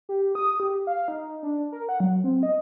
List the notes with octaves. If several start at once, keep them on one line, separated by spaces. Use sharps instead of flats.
G4
D#6
G4
F5
D#4
D4
A#4
F#5
F#3
C4
D#5